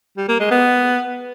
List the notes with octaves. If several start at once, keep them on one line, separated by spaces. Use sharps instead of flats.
G3
A#3
G#3
B3